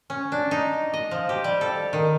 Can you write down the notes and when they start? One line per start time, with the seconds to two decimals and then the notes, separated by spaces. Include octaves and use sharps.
0.10 C#4
0.32 D4
0.51 D#4
0.93 D#5
1.11 F3
1.29 G4
1.44 G3
1.61 A4
1.93 D#3